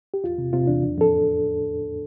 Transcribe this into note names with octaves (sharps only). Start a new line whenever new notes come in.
G4
E2 F4
C3
C3 F4
E2 D4
F2
F2 A4